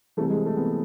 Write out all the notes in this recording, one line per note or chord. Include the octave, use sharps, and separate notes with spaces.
C2 C3 E3 A3
G#3
A3
C2 C3 E3 B3